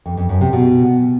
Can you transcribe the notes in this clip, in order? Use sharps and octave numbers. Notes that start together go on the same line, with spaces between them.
F2
F2
F#2
C3
B2